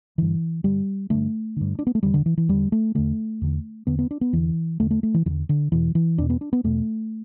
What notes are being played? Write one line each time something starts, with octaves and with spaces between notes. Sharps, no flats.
G2 D3 E3
G2 D3 G3
G2 D3 A3
G2 D3
D4
B3
A3
E2 D3 G3
D3
E3
E3
E2 D3 G3
A3
E2 D3 A3
E2 D3
E2 D3 B3
B3
D4
B3
E2 D3 E3
E2 D3 A3
A3
A3
E3
E2 D3 E3
D3
E2 B2 E3
E3
E2 B2 D4
B3
D4
B3
E2 B2 A3